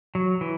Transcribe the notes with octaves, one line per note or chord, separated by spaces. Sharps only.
F#3
E3